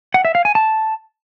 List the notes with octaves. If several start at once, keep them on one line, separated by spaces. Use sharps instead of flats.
F#5
E5
F5
G#5
A5